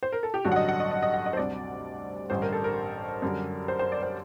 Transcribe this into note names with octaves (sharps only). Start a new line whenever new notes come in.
C5
A#4
A4
G4
A1 G2 D3 F#3 F#4
F#5
D#5
F#5
D#5
D#5
D#5
F#5
D#5
C5
D2 C3 G3 D5
A1 G2 D3 G3 C5
A#4
A4
A#4
F#2 D3 G3
C5
C5
D5
C5